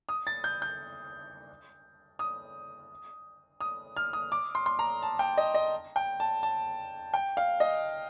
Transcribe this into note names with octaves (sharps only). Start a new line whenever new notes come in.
D#6
A6
G6
G6
D#6
D#6
F6
D#6
D6
C6
C6
A#5
A5
G5
D#5
D#5
G5
A5
A5
G5
F5
D#5